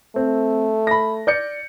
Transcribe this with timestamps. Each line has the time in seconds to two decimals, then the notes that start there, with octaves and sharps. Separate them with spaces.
0.16 A3 C4
0.87 B5 A#6
1.27 D5 G6 C#7